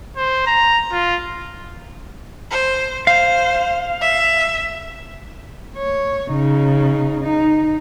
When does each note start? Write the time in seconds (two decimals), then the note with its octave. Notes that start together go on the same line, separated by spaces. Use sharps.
0.16 C5
0.47 A#5
0.92 F4
2.51 C5
3.07 C5 F5
4.02 E5
5.77 C#5
6.30 C#3 D#4
7.22 D#4